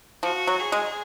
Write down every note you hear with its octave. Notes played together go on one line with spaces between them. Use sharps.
F3 F#4
F#3
G#4
G#3